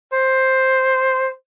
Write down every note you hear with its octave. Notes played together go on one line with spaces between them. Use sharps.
C5